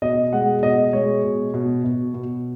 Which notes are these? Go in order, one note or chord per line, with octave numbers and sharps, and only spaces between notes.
B2 D#5
G#3 F#5
B2 D#5
G#3 C#5
B2
B2
B2
B2